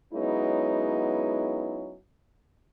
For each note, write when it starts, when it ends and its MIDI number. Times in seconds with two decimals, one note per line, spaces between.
0.13 1.94 54
0.13 1.94 56
0.13 1.94 59
0.13 1.94 61
0.13 1.94 63
0.13 1.94 64